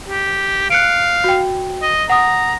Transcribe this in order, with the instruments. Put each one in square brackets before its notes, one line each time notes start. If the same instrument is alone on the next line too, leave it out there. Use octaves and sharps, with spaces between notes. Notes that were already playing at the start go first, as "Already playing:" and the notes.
[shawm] G4
[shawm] F5 [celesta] F#6 C#7 D7
[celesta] F#4 G5
[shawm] D#5
[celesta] F#5 D#6 [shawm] A#5